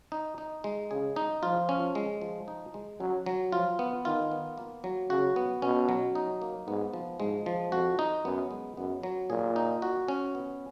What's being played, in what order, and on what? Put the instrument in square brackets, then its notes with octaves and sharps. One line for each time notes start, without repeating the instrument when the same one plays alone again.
[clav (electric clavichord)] D#4
D#4
G#3
[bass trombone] C#3 [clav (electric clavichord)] G#4
[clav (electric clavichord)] D#4
[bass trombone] F3 [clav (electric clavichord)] F4
[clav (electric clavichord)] C#4
G#3
F3
D#4
G#3
[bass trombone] F#3 [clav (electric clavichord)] C#4
[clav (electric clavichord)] F#3
[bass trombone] F3 [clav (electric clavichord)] F4
[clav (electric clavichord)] B3
[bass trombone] D#3 [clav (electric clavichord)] F4
[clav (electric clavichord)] B3
A#3
F#3
[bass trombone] C#3 [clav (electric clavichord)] F#4
[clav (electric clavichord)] B3
[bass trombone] B2 [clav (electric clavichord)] C#4
[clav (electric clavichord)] F#3
D#4
A#3
[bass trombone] G#2 [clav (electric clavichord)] B3
[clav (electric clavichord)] F3
[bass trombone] G#2 [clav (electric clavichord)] G#3
[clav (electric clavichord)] F3
[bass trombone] F2 [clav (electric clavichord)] F#4
[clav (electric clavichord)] D#4
[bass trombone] F#2 [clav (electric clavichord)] B3
[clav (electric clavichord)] G#3
[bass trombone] F#2 [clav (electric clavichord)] B3
[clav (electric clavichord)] F#3
[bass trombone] A#2 [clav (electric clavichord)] G#4
[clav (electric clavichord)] D#4
F#4
C#4
B3